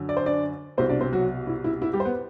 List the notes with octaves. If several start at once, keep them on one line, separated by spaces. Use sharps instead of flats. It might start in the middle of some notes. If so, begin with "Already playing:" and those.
Already playing: F#2 D3
D5
C5
D4 D5
C2 B2 C4 C5
D4 D5
C4 C5
F#3 F#4
E4
E4
E4
G3 G4
C5
B3 B4